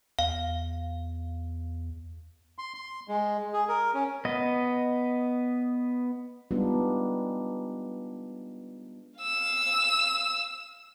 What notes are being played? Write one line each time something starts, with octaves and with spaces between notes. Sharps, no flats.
E2 F5
C6
C6
G#3
G#4
A#4
C#4
B3 D#5
G3 G#3 B3 D4 D#4 F4
F5 E6